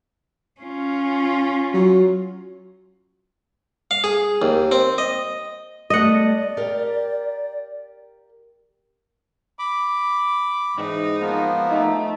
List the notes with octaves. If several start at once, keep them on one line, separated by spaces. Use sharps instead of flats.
C#4 F4
F#3
F5
G#4
D#2
C4
D#5
G3 A3 B3 D5 D#5 F#5
G4 A#4 F5
B5 D6
G#2 E3 D#4
F3 A#3 B3
A3 D#4